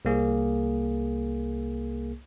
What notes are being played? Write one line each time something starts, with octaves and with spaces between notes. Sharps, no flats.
C2 A#3 G#4